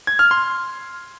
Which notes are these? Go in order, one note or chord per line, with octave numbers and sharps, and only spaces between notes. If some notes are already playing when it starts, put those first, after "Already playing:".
G#6
F6
C6